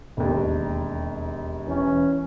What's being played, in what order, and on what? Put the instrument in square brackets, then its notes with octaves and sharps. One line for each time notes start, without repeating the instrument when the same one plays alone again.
[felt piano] E1 D#2
[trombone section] E3 C#4